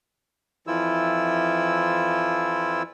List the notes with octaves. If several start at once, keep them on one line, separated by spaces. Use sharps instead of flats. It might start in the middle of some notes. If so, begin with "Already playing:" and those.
F2 E3 F3 E4 F4 E6